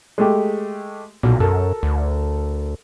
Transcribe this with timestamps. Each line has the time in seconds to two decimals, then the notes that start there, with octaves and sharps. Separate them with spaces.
0.18 G#3 A3 G4
1.23 B1 A#2
1.40 F#2 A4 A#4
1.83 D2